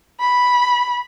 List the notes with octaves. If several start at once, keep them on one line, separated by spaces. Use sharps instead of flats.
B5